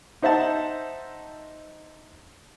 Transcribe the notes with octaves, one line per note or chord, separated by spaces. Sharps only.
D#4 C5 E5 F#5 A5